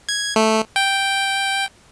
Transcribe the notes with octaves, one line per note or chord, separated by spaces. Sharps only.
G#6
A3
G5